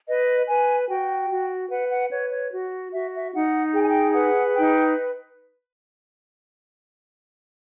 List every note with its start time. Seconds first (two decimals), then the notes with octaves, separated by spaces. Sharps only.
0.07 B4 D#5
0.47 B4 G#5
0.89 F#4 G5
1.30 F#4
1.70 B4 F#5
1.91 F#5
2.11 B4 C#5
2.32 C#5
2.52 F#4
2.93 F#4 E5
3.14 E5
3.34 D#4 F#5
3.75 G#4 G5
3.82 G#5
3.89 G5
4.15 B4 F#5
4.56 D#4 G5